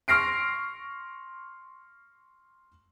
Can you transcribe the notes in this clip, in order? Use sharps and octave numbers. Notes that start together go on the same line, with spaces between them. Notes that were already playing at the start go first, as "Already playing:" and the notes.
C6 C#6 F6 A#6 C7 D7